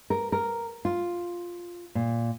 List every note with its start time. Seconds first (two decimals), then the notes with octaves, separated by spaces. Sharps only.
0.10 A#4
0.32 A#4
0.85 F4
1.95 A#2